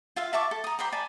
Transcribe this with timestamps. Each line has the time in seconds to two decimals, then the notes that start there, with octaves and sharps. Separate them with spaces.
0.16 F4 E5 F5
0.33 E5 A5 C#6 D6
0.51 A4
0.64 A#5 D#6
0.79 G4 C5 A#5 B5
0.92 D5 G#5 A5 B5